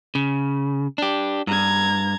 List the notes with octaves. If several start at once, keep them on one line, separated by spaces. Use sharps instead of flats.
C#3
D4 G4
G2 A#5 G#6